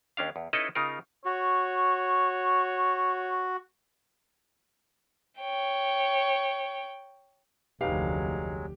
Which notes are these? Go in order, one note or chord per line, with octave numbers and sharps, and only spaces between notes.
D#2 C#4 D4 F5
E2
C#4 D#4 E4 A4 B4 D#5
C#3 D#4 F4 A#4
F#4 C#5
C#5 G5
F1 D2 F#3 G#3 D#4 G4 B4 F5